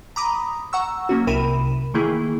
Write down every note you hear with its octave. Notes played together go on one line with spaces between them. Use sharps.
A#5 B5 D6 D#6
F#5 A#5 C#6 E6
F#3 A#3 C#4 F#4
C2 C3 A#4 B5 D#7 E7
D#3 E3 A3 A#3 E4 G#4